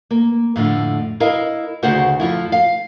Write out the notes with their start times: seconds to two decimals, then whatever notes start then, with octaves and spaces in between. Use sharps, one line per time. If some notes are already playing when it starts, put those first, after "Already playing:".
0.11 A#3
0.56 F2 A2 D3
1.20 E4 A#4 D#5 F5
1.83 D2 C#3 A#4 C5 F#5
2.20 F2 F3 E4
2.52 F5